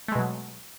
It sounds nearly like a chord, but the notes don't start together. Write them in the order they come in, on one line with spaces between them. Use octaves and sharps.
A3 G#3 B2 F#3